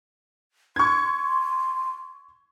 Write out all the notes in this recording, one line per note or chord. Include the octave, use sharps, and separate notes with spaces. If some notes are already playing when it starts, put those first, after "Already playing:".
C6 C#6 G#6